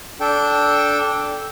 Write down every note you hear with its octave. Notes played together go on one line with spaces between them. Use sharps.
D4 A4 G5